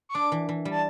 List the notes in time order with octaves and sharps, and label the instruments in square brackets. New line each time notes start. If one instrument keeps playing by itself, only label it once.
[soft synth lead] C#6
[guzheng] D4 [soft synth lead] D6
[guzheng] E3
E3
G3
[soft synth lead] A5